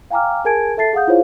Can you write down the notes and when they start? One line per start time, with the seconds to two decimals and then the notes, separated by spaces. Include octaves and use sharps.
0.11 F5 G5 G#5 A#5 D6 F6
0.45 G#4 A#4 G#5 A5 G#6 D7
0.77 A4 E5 A5 A6 C7
0.93 G#4 F5 F#5 D#6 G6
1.07 E4 F4 G#4 C5 C#5 F5